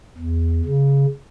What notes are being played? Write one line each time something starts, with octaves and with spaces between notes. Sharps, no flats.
E2
C#3